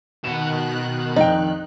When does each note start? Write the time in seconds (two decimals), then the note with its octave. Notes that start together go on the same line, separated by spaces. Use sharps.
0.24 B2 D#3 F#5 F#6 E7
1.16 A#1 F2 D#4 G5